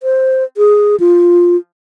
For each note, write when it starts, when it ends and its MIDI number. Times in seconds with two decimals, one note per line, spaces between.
0.03 0.44 72
0.57 0.96 68
1.00 1.56 65